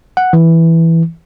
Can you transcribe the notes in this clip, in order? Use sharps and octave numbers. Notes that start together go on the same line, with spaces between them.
F#5
E3